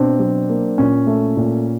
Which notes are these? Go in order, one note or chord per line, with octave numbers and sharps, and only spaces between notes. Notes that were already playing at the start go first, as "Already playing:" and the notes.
Already playing: B2 C4 D4
F#3
A#3
A#2 C#4
A3
A#2